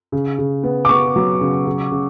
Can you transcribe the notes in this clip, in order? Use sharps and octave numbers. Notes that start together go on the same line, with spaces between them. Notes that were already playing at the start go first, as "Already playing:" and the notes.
C#3
C#3
B3
D6
B3 C#6
F#3
C#3
C#3
C#3